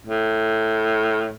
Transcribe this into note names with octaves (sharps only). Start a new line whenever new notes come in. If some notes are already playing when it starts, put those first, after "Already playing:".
A2